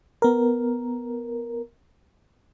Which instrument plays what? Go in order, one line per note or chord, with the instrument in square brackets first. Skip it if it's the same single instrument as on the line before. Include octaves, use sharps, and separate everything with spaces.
[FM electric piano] B3 A#4